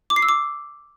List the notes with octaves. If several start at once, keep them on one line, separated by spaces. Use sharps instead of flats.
D6
C7
E6
D6